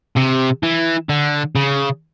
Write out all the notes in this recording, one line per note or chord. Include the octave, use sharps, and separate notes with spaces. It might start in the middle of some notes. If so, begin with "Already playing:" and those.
C3
E3
D3
C#3